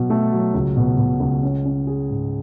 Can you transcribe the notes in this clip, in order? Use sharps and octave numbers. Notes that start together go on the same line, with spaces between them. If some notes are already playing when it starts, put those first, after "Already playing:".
Already playing: B2 F#3
A3
F#3
C#2
B2
B2
C#2
C#4
C#4
G#4
G#2